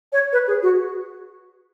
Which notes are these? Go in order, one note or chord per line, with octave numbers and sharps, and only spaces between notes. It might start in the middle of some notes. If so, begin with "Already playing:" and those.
C#5
B4
G#4
F#4